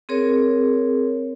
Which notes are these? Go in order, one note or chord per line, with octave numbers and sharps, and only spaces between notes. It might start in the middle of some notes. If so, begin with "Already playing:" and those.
C4 G#4 A#4 C#5